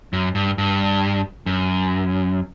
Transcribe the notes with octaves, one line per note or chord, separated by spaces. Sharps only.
F#2
G2
G2
F#2